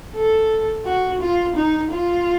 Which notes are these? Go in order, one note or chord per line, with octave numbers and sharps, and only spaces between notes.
A4
F#4
F4
D#4
F4